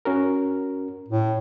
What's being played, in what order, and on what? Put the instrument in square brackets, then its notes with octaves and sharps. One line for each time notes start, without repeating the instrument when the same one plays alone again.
[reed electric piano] C#4 F#4 A#4
[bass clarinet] A2